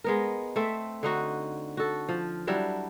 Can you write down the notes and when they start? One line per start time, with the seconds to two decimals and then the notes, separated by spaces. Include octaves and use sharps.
0.04 G#3 B3 A#4
0.56 A3 C4 E5
1.03 D3 D#4 F#4
1.77 F#4 A4
2.09 F3
2.47 F#3 G3 D4 E4